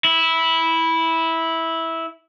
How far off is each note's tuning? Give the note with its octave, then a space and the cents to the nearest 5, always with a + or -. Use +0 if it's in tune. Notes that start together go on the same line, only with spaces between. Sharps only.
E4 -10